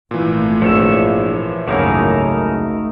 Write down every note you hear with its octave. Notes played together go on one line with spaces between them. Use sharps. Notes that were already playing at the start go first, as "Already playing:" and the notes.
G#1 A#2 E3 A3
A#1 F3 C#5 E5
G#1 C#2 F#2 C#3 A3 A#3 D#4 A#4